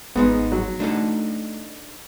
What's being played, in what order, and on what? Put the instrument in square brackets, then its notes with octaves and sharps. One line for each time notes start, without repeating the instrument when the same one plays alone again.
[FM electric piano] G#1 [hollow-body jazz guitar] G#2 G#3 D#4 [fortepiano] B3
[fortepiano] F#3
[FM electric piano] A3 [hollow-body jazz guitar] D4 D#4 A4